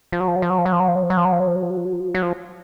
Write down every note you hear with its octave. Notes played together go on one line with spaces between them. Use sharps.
F3
F#3
F3
F#3
F3
F#3
F3
F#3
F3
F#3
F3
F#3
F3
F#3
F3
F#3
F3
F#3
F3
F#3
F3
F#3
F3
F#3
F3
F#3
F3
F#3
F3